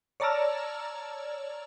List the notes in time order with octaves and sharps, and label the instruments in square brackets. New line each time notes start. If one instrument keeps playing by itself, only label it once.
[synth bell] C#5 D5 A5 A#5 E6 F6